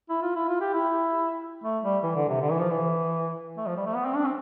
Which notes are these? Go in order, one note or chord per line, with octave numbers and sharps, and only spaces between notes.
E4
F4
E4
F4
G4
E4
A3
G3
E3
D3
C3
D3
E3
F3
E3
A3
F3
G3
A3
B3
C4
D4
C4